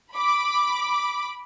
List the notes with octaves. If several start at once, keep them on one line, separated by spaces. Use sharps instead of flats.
B5 D6